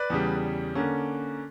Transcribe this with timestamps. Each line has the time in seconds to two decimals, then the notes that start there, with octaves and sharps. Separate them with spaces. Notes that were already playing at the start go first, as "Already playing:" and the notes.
Already playing: B4 D5
0.10 E2 C#3 G3
0.75 D3 A#3 C#4